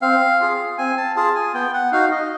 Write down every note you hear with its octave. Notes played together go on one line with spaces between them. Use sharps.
C4 F5
F4 G#4
C4 G#5
A5
F4 G#4 A5
G#5
B3 G5
F#5
D#4 F#4 F5
D#5